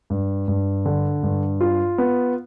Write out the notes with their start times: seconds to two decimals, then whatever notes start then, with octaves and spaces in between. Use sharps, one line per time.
0.10 G2
0.48 G2
0.86 D3
1.23 G2
1.61 F4
1.98 B3